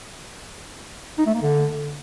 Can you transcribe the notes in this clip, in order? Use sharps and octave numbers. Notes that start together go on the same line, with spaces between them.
D#4
A3
A#3
D3